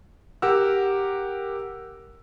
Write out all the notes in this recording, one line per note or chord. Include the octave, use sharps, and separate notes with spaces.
G4 A#4 F#5 E6